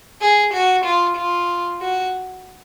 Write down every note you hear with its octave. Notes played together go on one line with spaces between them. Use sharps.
G#4
F#4
F4
F4
F#4